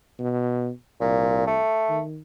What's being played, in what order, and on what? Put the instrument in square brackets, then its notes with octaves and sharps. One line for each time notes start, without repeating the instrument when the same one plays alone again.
[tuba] B2
[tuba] C2 [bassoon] A#2
[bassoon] A3
[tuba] D#3